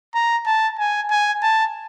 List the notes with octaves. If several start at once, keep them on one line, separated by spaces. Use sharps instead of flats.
A#5
A5
G#5
G#5
A5